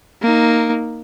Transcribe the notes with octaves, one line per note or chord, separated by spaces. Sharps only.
A#3 D#4